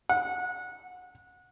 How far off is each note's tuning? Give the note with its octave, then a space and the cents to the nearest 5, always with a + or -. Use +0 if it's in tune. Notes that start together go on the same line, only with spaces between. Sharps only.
F#5 -25